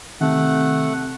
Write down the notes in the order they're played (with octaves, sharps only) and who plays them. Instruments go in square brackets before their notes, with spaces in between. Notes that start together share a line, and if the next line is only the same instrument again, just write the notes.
[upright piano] C3 [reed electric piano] D#3 [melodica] A3 F#5